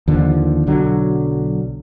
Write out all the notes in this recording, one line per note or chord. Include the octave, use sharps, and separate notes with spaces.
D#2 D3 F3
B1 D3 F#3